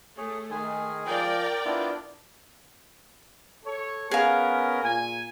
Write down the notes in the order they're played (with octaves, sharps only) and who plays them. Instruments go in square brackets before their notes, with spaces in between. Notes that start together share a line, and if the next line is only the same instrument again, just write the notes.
[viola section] A3 [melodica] G#4 C#5
[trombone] D#3 [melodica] G#3 G#4 G#5
[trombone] F3 [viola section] A#4 D5 G5
[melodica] B3 E4 F4 [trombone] D4
[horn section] A4 C#5
[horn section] B3 C#4 A#4 [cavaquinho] G#4 F5
[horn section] A#2 G#5